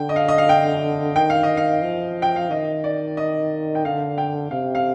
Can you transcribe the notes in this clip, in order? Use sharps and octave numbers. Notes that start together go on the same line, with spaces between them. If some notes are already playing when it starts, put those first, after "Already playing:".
Already playing: D3 G5
D#5
F5
D#5
F5
G5
D#3 G5
F5
D#5
F5
F3
G5
F5
D#3 D#5
D5
D#5
G5
D3 F5
G5
C3 F5
F5